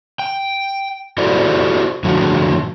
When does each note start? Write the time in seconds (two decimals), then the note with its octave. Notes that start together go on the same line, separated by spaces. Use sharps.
0.19 G5
1.18 E4 F#4 G4 A4 C5 D5
2.04 A2 D3 F3 F#4